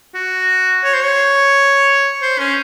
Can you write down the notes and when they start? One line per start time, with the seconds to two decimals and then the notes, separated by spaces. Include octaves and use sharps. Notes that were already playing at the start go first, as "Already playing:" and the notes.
0.14 F#4
0.84 C#5
0.94 C5
1.03 C#5
2.22 C5
2.39 C#4